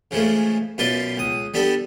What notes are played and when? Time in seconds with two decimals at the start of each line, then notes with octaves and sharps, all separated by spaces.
0.11 C#3 E3 F3 G#3 A3
0.78 F#2 B2 F4 B4 D5 C6
1.17 C#2 D#6
1.54 G3 B3 D4 G4 A4